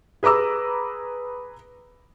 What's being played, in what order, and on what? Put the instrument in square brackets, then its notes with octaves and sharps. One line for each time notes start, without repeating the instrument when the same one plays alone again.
[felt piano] G#4 B4 A#5 D6 E6